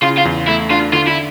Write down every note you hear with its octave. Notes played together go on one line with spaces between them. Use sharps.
C#3 F4
F4
E2
A3 E4
D4 F4
D3 F4
E4